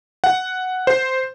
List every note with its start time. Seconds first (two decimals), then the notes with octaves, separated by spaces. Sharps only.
0.24 F#5
0.87 C5